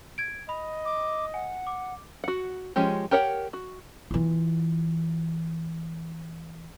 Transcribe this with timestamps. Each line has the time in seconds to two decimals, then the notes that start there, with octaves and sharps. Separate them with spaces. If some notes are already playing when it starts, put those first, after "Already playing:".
0.18 G#6 D7
0.49 D#5 B5
0.85 D6
1.34 F#5 G#5
1.67 D6
2.24 F#4 F#5
2.76 F3 G#3 C#4 G4
3.11 G4 A#4 C#5 F#5 G5
3.53 F#4
4.11 E3 F4